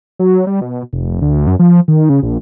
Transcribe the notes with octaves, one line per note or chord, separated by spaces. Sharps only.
F#3
G3
B2
F1
D2
F#2
F3
D#3
C#3
A#1